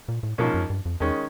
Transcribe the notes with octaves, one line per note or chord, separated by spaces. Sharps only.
A#2
A2
G#2 B2 F3 A#3 C#4
F#2
G2
F2
E2 D#3 G#3 C#4